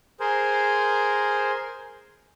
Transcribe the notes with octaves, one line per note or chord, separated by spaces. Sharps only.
G#4 A#4 C5